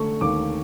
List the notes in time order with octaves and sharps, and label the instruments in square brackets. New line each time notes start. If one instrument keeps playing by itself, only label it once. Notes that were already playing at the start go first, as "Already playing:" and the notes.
Already playing: [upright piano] D3 A3 C#6
D#2 D6